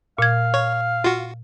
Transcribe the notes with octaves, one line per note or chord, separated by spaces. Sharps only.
A#2 F5 G#6
C#5
F4 F#4